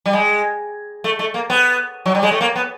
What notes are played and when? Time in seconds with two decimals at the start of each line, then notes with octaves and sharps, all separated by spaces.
0.06 G3
0.13 G#3
1.04 A3
1.19 A3
1.34 A#3
1.50 B3
2.06 F#3
2.15 G3
2.23 G#3
2.31 A3
2.41 A#3
2.56 B3